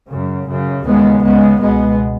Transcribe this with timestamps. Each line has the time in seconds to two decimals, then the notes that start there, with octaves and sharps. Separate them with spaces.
0.09 F#2 C#3
0.47 F#2 C#3
0.84 D#2 C#3 G#3 B3
1.22 C#2 C#3 G#3 B3
1.59 C#2 B2 G#3 B3